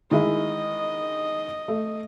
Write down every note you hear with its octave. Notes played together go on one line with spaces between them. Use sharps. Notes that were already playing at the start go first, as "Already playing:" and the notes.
D#3 G#3 E4 D#5
A3